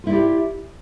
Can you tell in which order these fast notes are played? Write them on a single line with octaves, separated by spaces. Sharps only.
F4 E4 D5 G4